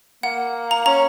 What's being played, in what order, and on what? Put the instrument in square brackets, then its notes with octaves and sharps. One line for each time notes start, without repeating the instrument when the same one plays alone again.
[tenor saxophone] A#3 [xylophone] F#5
[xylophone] A#5
[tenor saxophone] C#4 [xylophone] A#5